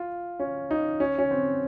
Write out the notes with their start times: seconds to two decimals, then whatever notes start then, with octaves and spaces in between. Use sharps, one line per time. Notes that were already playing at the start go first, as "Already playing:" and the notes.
Already playing: F4
0.39 C#4
0.71 D#4
1.00 C#4
1.19 C#4
1.31 C4